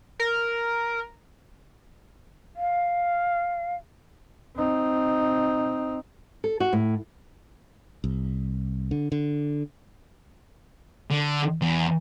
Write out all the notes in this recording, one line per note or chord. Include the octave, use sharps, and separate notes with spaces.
A#4
F5
C4 D#4
A4
F#4
A2
C2
D3
D3
D3
E2